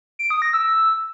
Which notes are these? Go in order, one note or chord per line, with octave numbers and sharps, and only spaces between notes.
D7
D#6
A#6
E6